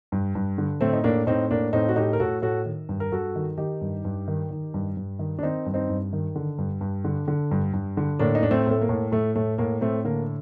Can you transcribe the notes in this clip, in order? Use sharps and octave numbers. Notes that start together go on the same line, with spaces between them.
G2
G2
D3
A2 A3 C4
D#4
A2 A#3 D4
A2 C4 D#4
A2 A#3 D4
A2 C4 D#4
F#4
A2 D#4 G4
A#4
A2 F#4 A4
A2 F#4 A4
D#3
G2
A#4
G2 F#4 A4
D#3
D#3 D#4 G4
G2
G2
D#3
D#3
G2
G2
D#3
D4
D#3 C4 D#4
G2
C4 D#4
G2
D#3
D3
G2
G2
D3
D3
G2
G2
D3
A2 A#3 D4
D#4
A2 D4
A3 C4
A2 A3
A#3
A2
A2 A3
A2 A3
A2 A#3
A2 A3 C4
D3 A#3